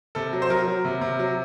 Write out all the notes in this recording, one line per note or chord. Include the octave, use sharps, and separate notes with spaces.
C3 A4
F#3
C5
F#3 A#4
F#3
C3
C3
F#3